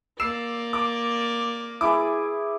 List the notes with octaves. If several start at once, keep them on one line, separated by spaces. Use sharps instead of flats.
A#3 D5 E6 C7 E7
D6
E4 G#4 B4 D6